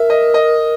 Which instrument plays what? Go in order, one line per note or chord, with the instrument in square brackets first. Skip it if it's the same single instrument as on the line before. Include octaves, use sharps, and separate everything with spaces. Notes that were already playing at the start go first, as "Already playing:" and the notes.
Already playing: [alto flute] A#4 [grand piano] E5
[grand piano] D#5
D#5